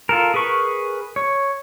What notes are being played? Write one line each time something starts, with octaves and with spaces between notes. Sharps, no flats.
F4 A4 A#4
G#4 A#4 B4 C#6
C#5